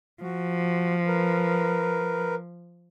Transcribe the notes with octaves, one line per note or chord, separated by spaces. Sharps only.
F3 F#4
A#4 B4